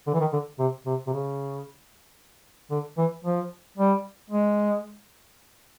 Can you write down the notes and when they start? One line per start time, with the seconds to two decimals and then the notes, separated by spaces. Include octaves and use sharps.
0.07 D3
0.13 E3
0.20 D#3
0.33 D3
0.59 C3
0.86 C3
1.07 C3
1.13 C#3
2.71 D3
2.98 E3
3.25 F3
3.77 G3
4.30 G#3